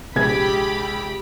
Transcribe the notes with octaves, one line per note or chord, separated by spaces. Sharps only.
A#1 C3 G#3 G4 G#4 B5 G#6